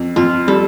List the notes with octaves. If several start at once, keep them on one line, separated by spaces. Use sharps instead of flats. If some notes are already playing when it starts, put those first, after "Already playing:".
Already playing: F2
F2 F4
G3 A4